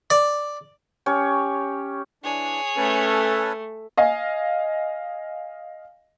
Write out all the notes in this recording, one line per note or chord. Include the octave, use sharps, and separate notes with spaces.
D5
C#4 G4 C#5
E3 D4 G#4 C#5
A3 C#4 A4 B4
D#5 F5 G#5